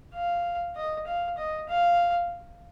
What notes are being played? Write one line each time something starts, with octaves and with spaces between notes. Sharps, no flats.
F5
D#5
F5
D#5
F5